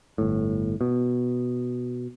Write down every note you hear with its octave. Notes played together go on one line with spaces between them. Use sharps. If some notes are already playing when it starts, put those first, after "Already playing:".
G1 A2
B2